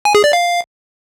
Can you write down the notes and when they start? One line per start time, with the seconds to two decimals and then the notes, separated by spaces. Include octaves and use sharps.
0.05 G#5
0.15 G#4
0.24 D5
0.33 F5